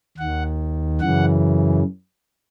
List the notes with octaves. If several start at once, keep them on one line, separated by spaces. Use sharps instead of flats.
D#2 D#3 F#5
F#2 C#3 E3 F#5